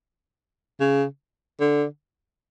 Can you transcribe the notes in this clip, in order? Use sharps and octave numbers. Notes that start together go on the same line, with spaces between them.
C#3
D3